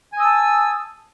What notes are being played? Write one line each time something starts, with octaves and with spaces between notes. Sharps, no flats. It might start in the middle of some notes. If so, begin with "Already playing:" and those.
G#5 A5 D#6 E6